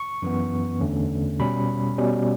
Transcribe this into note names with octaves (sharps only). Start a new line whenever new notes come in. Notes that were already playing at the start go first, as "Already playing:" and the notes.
Already playing: C#6
F#2 E3 B3
E2 D3 A3 C#4
B2 G3 C#4 B5
B2 G3 C#4